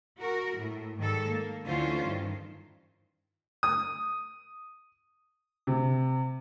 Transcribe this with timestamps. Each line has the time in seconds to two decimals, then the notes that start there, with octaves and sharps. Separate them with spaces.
0.20 F#4 A#4
0.57 A2
0.98 G#2 D#3 G3 A4
1.28 A#3
1.63 D2 D3 E3 C#4 F4 C5
2.04 G2 D#3
3.63 D#6
5.67 C3